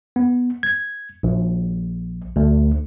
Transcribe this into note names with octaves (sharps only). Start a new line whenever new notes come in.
B3
G#6
A#1
D2